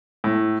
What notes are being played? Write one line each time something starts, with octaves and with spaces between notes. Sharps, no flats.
A2